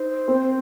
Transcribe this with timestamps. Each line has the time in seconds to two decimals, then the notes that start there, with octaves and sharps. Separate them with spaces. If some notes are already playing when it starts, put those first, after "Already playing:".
Already playing: D#4 C5
0.28 C4